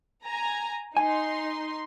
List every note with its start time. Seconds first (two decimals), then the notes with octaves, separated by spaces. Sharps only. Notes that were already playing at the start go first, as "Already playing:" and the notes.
0.25 G#5 A#5
0.97 D#4 G#5 C6